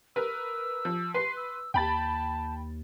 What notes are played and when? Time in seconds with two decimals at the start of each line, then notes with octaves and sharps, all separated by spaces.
0.16 A#4 B4 E6
0.85 F3
1.14 B4 C6 C7
1.37 E6
1.74 D#2 G5 A5 B5 A6